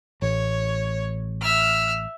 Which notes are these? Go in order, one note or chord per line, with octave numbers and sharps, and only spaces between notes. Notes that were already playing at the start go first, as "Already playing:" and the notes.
A1 C#5
E5 F6